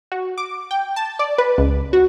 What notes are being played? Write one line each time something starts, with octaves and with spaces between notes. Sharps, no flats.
F#4
D6
G5
A5
D5
B4
C#2
F#4